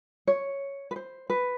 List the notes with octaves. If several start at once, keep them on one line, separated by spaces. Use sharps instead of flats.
C#5
B4
C5
B4